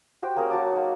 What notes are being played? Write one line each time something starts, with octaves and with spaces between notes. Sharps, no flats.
F#4 G4 C5 G5
A#3 C#4 G#4 A#4
F#3 F#4 A5 D6
A#3 D#4